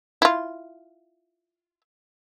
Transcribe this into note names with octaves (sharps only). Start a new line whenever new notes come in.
E4 F4